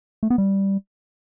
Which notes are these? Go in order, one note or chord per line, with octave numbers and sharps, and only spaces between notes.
A3
B3
G3